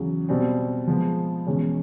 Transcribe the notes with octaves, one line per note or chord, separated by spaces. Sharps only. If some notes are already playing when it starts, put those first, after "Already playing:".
Already playing: E2 C#3 F#3
B2 G3 C4
F3 G#3 B3
E2 B2 G#3 C#4